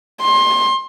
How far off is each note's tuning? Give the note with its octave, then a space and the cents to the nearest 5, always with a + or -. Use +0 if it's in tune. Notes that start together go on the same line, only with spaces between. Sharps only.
C6 +25